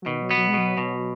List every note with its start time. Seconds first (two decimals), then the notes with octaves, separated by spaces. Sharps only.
0.02 F#3
0.06 B2 D#3
0.22 F#3
0.31 B3
0.37 F#3
0.48 G#3
0.54 B2 F#3
0.77 B2